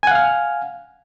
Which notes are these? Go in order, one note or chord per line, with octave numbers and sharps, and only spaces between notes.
F5 F#5 G#5 F6